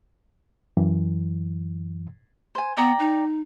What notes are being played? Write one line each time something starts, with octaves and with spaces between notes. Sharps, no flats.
F#2 E3
C5 G#5
B3 D5 G5 A#5
D#4